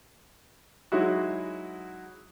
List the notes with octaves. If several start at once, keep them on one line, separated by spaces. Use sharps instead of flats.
F#3 G#3 D#4 E4 F#4